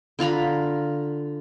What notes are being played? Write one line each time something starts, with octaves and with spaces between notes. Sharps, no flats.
D3 F4 A#5 B5